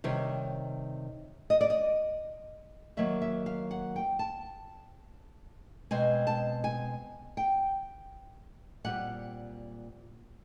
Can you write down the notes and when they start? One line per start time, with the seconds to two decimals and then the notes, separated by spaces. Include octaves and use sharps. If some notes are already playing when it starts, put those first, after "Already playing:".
0.04 C3 D#3 G3 C#5
1.50 D#5
1.61 D5
1.70 D#5
2.97 D#3 F#3 A#3 E5
3.22 E5
3.46 F5
3.71 F#5
3.96 G5
4.19 A5
5.91 B2 G#3 C4 G#5
6.27 A5
6.64 G#5
7.37 G5
8.84 A#2 G3 C4 F#5